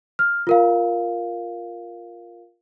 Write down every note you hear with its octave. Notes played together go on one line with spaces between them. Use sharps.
F6
F4 A#4 F5